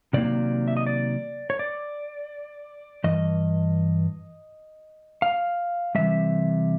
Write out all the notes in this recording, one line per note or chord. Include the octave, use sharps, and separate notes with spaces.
C3 D#3 F#3 A#3 D5
E5
D#5
D5
C#5
D5
G2 E3 D#5
F5
C3 E3 G3 E5